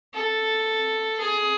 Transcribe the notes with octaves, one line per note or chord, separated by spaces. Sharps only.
A4
G#4